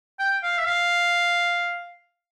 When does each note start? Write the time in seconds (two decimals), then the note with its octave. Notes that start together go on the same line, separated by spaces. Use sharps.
0.19 G5
0.43 F5
0.58 E5
0.66 F5